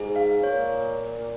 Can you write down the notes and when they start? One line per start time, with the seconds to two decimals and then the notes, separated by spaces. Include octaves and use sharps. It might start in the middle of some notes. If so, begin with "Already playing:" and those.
Already playing: G#2 G#4
0.16 F5
0.43 A#2 C#5